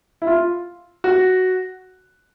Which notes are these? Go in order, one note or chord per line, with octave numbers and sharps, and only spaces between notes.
E4
F4
F#4